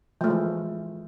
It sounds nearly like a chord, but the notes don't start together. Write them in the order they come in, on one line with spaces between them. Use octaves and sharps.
F3 A3 G#3 E3